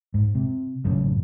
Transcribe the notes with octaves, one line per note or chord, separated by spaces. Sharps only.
G#2
C3
A1 F#2 A2 C#3